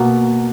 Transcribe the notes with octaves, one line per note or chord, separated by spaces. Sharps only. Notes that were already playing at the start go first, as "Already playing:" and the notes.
Already playing: B2 A#3